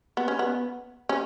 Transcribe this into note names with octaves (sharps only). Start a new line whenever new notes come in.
B3
C#4
B3
C#4